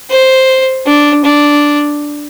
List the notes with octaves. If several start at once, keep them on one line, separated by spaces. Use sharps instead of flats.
C5
D4
D4